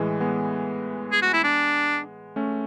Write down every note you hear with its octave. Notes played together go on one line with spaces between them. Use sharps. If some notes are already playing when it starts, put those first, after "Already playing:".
Already playing: A2 E3 G#3
G#3 B3
G#4
F#4
E4
D4
A3 C#4